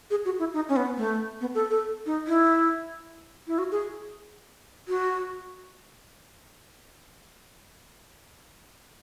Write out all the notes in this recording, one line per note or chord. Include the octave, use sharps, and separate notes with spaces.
G#4
F#4
E4
D#4
C#4
B3
A3
B3
A4
A4
D#4
E4
E4
F#4
G#4
F#4